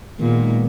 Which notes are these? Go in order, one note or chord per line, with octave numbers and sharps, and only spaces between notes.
A#2 D#3 G#3 B3